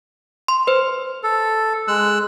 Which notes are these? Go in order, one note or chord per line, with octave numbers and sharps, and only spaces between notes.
C6
B4 C5
A4
G#3 E6 F#6